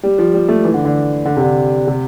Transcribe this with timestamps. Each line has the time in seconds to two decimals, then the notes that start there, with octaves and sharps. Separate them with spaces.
0.03 G3
0.18 F3
0.34 G3
0.49 A3
0.64 E3
0.74 D3
0.85 D3
1.25 D3
1.36 C3
1.41 D3
1.87 C3